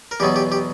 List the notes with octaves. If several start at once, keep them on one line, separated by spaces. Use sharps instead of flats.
A#4
E2 B2 F#3 B3 G4
G4
G4